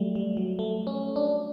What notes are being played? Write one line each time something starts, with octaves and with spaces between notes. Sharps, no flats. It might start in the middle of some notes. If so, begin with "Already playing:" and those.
Already playing: F#3 G3 A3
G3
F#3
A3
C#4
D4